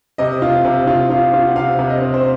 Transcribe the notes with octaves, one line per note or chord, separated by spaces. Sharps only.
C3 D#5
F4
C3
F4
F4
F4
F#5
C3 F5
C3
D#5
C4
C5